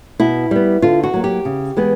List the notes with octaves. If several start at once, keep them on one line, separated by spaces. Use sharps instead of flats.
B2 E4
G3 B3
D3 F4
F#4
F#3 A#3
G4
C#3
E3 G#3 B3